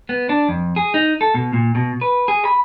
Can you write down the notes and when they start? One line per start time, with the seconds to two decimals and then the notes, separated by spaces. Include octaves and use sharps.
0.09 B3
0.29 D4
0.49 F2
0.76 G#4
0.94 D#4
1.21 A4
1.34 B2
1.53 A#2
1.75 B2
2.01 B4
2.28 G#4
2.45 B5